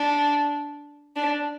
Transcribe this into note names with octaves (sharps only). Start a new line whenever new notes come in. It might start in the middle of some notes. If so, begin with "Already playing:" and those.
Already playing: D4
D4